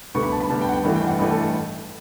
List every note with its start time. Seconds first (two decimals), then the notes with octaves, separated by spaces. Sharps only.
0.15 D2 D3 G3 B3 C#6
0.23 B5
0.32 A5
0.40 B5
0.49 D2 D3 G3 B3 A5
0.61 G5
0.69 F#5
0.72 G5
0.84 A1 G2 E3 A3
0.96 G5
1.07 F#5
1.19 A1 G2 E3 A3 G5
1.31 A4